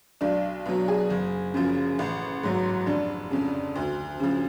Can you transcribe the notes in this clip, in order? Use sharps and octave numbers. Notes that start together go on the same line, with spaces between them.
B1 D4
B2 F#3
G#4
F#1
F#2 C#3 F3
A1
G#2 F#3
F1 D4
F2 C#3
D2
C#3 F3